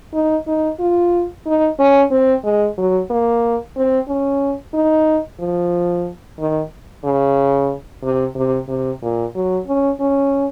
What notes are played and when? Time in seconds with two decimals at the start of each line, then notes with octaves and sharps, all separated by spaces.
0.14 D#4
0.47 D#4
0.80 F4
1.47 D#4
1.79 C#4
2.11 C4
2.44 G#3
2.78 F#3
3.10 A#3
3.77 C4
4.08 C#4
4.74 D#4
5.40 F3
6.39 D#3
7.04 C#3
8.03 C3
8.36 C3
8.68 C3
9.03 A#2
9.35 F#3
9.67 C#4
10.00 C#4